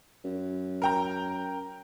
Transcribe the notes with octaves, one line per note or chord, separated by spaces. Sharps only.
F#2
A#4 G5 A#5